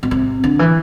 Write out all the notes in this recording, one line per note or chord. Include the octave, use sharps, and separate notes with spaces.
B2
C3
D3
E3